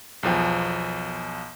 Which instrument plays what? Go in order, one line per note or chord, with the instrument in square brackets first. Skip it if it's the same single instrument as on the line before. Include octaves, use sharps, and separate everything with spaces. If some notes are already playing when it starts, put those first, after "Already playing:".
[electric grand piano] B1 E2 F3 G5